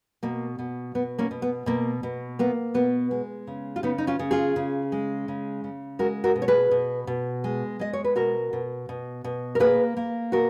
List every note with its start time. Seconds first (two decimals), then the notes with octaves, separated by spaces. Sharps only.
0.23 B2 A#3
0.59 B2
0.95 B2 B3
1.19 A#3 C#4
1.31 B2
1.42 B3
1.66 B2 A#3
2.03 B2
2.39 A#3 B3
2.74 B2 B3
3.11 G#3
3.47 C#3
3.76 F4
3.83 C#3 B3 D#4
3.98 D#4
4.07 C#4 F4
4.19 C#3
4.31 F4 G#4
4.56 C#3
4.92 G#3
5.28 C#3
5.64 C#3
5.99 G#3 F#4 A#4
6.24 F#4 A#4
6.36 B2
6.42 C#5
6.48 G#4 B4
6.71 B2
7.07 B2
7.44 G#3
7.80 G#3 D#5
7.93 C#5
8.04 B4
8.16 B2 F#4 A#4
8.53 B2
8.89 B2
9.24 B2
9.55 A#4
9.60 A#3 G#4 B4
9.97 A#3
10.32 B2 F#4 A#4